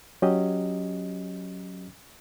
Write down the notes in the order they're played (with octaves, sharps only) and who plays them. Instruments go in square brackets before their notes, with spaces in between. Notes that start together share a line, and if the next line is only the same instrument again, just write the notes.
[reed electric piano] F#3 C#4 G4 D#5